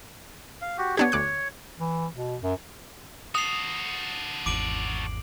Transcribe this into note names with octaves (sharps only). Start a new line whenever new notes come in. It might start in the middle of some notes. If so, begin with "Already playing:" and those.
F5
F#4 G4
B3 D4 G4 C#5
D2 D6 F#6
E3
B2
F#2
F#4 A4 D#6 C7 F7
G#1 E2 D6 D7 F#7